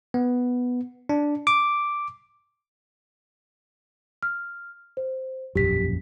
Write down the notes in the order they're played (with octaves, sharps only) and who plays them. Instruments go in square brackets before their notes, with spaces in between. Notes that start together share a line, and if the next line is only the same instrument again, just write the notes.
[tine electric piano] B3
D4
D6
[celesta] F6
C5
[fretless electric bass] E1 A#1 F#2 [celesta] G4 B6